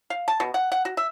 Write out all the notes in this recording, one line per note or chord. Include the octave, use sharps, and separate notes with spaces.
F5
A5
B2
F#5
F#5
F#4
E5